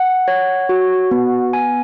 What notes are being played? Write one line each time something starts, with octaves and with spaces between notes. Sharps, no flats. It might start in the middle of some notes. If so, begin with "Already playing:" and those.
Already playing: F#5
C#5
F#4
B3
G#5